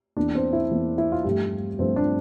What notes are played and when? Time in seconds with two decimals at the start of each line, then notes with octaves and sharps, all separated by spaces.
0.17 E2 E3 A#3 D4
0.35 C4
0.53 E4
0.71 E2 E3 A#3
0.98 E4
1.12 F4
1.24 G2 F3 A3 G4
1.79 G2 F3 A3 C4
1.96 D4